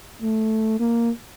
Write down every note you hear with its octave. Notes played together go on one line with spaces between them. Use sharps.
A3
A#3